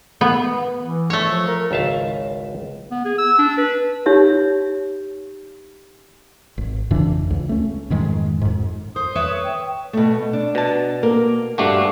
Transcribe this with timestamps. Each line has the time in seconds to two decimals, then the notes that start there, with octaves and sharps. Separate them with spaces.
0.21 B3
0.81 E3
1.10 A3 C#5
1.27 F3
1.47 A#4
1.71 G#1 C#2 E5 F5 A5
2.91 B3
3.05 G#4
3.18 E6
3.39 D4
3.58 B4
4.06 D#4 G4 C#5 E5
6.58 G#1
6.91 F2 C#3 E3 D4
7.30 C#2
7.49 A3 C#4
7.90 F2 G#2 D#3 G#3
8.42 F2 G#2
8.96 C5 D#6
9.15 B4 C#5 E5
9.44 G5
9.93 B2 A3
10.33 D4
10.55 B2 A5
11.03 A#3 A#4
11.58 G2 A3 D4 F#4 G4 F5